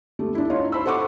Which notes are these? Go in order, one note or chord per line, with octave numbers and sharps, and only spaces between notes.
G3 A3
D4 E4
D#4 F4 C#5
C5 B5 E6
A4 C5 F#5 C#6 D6